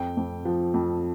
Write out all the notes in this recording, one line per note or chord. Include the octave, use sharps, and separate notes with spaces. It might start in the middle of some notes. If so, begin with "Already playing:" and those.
Already playing: F2 G5
F2
F3
F2